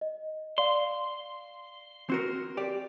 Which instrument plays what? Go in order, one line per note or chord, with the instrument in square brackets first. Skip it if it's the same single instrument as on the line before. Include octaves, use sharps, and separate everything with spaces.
[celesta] D#5
[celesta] D5 F5 [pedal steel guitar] C6
[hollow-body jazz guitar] C4 F#4 A#4
G4 D5